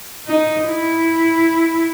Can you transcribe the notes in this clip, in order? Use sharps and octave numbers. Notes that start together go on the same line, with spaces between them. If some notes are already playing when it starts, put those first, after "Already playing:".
D#4
E4